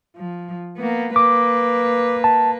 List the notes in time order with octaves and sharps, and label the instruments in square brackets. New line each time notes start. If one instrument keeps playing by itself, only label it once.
[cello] F3
A#3 B3
[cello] A#3 B4 [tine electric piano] D6
[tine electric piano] A5